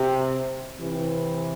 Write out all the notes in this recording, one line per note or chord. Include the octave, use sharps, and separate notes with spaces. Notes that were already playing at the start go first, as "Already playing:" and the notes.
Already playing: C3
C3 E3